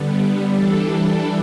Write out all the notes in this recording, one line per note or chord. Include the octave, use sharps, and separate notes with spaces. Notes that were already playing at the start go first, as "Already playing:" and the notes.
Already playing: D3 G3 B3
E3 G3 D4 A4